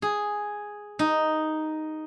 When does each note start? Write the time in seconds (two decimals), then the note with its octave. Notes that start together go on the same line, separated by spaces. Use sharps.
0.02 G#4
0.99 D#4